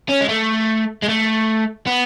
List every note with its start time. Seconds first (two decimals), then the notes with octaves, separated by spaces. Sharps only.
0.09 C#4
0.21 G#3
0.28 A3
1.02 G#3
1.08 A3
1.87 B3